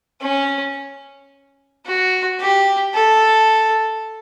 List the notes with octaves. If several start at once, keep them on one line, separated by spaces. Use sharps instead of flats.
C#4
F#4
G4
A4